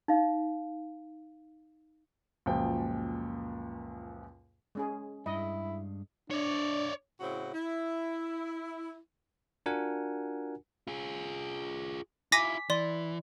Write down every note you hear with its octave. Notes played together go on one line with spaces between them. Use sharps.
D#4 F5
C#2 F#2 A#2 F3 G5
G#3 C#4 G#4
G2 G#3 E4 D#5
D4 C#5 D5
A2 C#3 C4 E4 F#4
E4
D4 F4 F#4 A#4 F#5 G#5
F4 G#4
E4 F4 G#5 D6 A#6 B6
E3 D5 C6